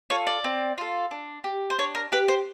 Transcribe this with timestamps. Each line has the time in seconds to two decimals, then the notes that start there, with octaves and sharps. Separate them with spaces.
0.10 F4 A4 C#5
0.27 D5
0.44 C4
0.78 F4 A4
1.11 D4
1.44 G4
1.70 C5
1.78 D4 C#5
1.95 A#4
2.12 G4 B4
2.28 C5